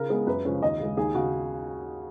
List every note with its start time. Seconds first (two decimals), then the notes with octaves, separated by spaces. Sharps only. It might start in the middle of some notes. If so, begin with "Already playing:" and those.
Already playing: C#3 A#4
0.10 G#3 B3
0.27 F#2 B4
0.45 C#3 F3 G#3 C#4
0.62 D#2 D#5
0.80 C#3 G#3
0.97 D#2 G#4
1.15 C#3 F#4